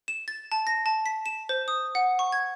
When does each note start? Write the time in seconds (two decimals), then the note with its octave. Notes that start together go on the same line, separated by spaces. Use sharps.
0.08 E7
0.28 A6
0.52 A5
0.67 A#6
0.86 A5
1.06 B6
1.26 E7
1.49 C5
1.68 D#6
1.95 F#5
2.19 C#6
2.32 G#6